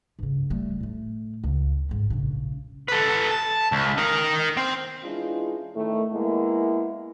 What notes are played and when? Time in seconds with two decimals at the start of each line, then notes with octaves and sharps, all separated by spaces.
0.19 G2 C#3
0.50 G3 A3
0.80 A2 A3
1.44 C#2
1.89 A1 G#2
2.10 A#1 C#3
2.88 A4 B4
3.31 A5
3.72 C#2
3.98 D#4 A#4
4.57 C4
5.04 E3 G#3 C#4 D4 E4 F4
5.76 A2 D#3 A3
6.13 G#3 A#3 B3 E4